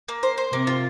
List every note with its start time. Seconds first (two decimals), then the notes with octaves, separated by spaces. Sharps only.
0.08 A#3
0.23 C5
0.38 C5
0.52 C3 A#3
0.67 F4